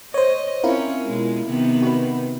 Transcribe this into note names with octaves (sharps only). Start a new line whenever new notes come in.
C5 C#5 D#5
C4 C#4 E4 F4 A#4
B2 G#3
C3 D#3 B3
F#4 B4